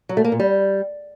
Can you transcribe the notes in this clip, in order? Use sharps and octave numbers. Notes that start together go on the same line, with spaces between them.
F#3
A3
A#3
A#2
G3